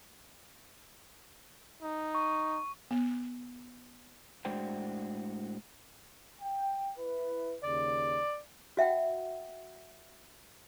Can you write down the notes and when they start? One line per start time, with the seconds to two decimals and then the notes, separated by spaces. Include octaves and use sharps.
1.83 D#4
2.15 C#6
2.91 B3
4.45 A2 G#3 D4 F#4 C5 G5
6.41 G5
6.98 E4 B4
7.64 D#2 C#3 D5
8.77 F#4 E5 F#5 G5